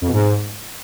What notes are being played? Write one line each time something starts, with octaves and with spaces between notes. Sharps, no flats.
F2
B2
G#2